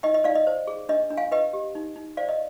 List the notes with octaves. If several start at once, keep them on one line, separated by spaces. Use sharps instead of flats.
D#4 D#5 G5
D#5
D#4 D5 F5
D#5
C5
G#4
D4 D#5
D4
F5 G#5
B4 D#5 G5
G4
D#4
D#4
C5 D5 F5
D#5